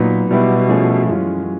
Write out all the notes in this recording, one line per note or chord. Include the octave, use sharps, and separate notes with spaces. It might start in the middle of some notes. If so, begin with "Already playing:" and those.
Already playing: A#2 F#3 B3 D#4
B2 G3 B3 E4 G4 B4
F3 A3 C#4 E4 G#4
F#2 E3 G#3 C#4 F4